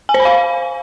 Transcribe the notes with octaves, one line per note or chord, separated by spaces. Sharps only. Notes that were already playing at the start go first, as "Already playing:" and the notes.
G#5
C5
B5
F5